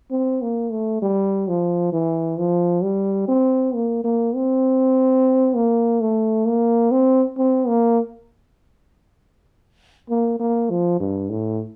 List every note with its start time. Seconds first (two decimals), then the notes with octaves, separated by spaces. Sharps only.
0.11 C4
0.42 A#3
0.71 A3
1.02 G3
1.48 F3
1.93 E3
2.38 F3
2.83 G3
3.28 C4
3.75 A#3
4.04 A#3
4.35 C4
5.55 A#3
6.01 A3
6.47 A#3
6.91 C4
7.38 C4
7.68 A#3
10.10 A#3
10.39 A#3
10.70 F3
11.00 G2
11.30 A2